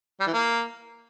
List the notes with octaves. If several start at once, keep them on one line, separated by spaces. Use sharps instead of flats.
G3
E3
A#3